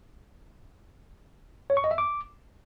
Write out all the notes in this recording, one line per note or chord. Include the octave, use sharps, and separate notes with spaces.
C#5
C#6
D#5
E5
D6